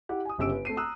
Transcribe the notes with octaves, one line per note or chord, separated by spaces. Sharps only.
E4 G4 F#5
G#5 D#6
G1 C#3 G4 E6 D7
B4
A3 C4 C7 D#7
A#5 D#6 E6 F#6